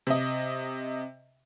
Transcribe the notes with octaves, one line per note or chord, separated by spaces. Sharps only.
C3 D#5